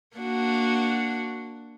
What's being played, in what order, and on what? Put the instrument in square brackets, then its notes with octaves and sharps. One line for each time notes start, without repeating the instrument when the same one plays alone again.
[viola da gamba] A#3 D4 F#4